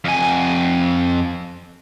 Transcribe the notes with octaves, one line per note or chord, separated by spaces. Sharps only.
F2 G#5